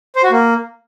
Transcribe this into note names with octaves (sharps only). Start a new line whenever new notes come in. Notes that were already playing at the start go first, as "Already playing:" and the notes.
C5
F#4
A#3